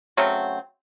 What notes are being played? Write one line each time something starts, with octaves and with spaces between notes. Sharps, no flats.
C#3 F#3 A3 C4